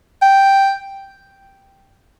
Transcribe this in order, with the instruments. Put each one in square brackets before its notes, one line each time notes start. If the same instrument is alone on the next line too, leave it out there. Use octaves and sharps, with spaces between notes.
[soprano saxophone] G5